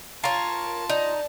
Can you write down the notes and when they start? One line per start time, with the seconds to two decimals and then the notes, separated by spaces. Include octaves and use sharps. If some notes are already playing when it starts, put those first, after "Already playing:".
0.24 F4 A#4 C#5 A5
0.89 D#4 D5